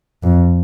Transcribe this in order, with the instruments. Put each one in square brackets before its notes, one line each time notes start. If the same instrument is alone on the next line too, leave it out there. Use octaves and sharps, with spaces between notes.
[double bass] F2